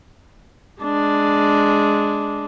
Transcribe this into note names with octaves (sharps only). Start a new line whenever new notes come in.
G#3 D4